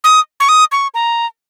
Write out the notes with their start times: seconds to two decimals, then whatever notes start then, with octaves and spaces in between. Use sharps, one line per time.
0.04 D#6
0.40 C#6
0.49 D#6
0.72 C#6
0.94 A#5